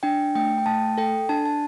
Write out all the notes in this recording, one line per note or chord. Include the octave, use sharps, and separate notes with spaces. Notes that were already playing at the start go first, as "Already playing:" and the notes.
D4 G5
A3 G5
G5
A3 A5
A4 G5
D4 A5
A5